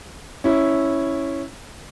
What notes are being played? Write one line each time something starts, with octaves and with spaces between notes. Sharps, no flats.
C#4 E4